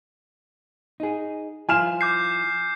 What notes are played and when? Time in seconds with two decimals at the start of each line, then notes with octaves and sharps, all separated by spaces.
1.00 D#4 G#4
1.69 F3 E4 F4 G#5 F6 E7
2.01 D6 G6 C7